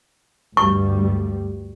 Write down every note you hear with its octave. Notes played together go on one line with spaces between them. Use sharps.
D2 G2 G3 C#6